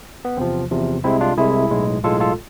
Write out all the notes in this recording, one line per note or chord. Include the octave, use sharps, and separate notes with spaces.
B3
E2 C3 F3 C4
E2 C3 F3
C2 C3 G#3 C4 E4
D4 F4
C2 C3 G#3 E4 G#4
B1 A2 G#3
B1 A2 G#3 F4 A4
F4 A4